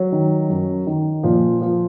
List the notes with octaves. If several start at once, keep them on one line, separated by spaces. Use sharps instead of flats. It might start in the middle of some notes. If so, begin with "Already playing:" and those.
Already playing: F#3
D#3
F#2
D#3
A#2 F3
F3